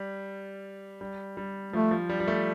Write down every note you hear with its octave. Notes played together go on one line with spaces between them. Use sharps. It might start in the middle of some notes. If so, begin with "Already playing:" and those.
Already playing: G3
G3
G3
F3 A3
F3
G3
G3
A3